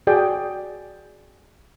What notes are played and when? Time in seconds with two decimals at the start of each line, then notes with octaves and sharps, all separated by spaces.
0.07 F#4 G#4 D5 G5